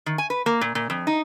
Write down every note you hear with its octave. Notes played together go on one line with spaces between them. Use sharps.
D#3
G#5
B4
A#3
A#2
A#2
F2
D#4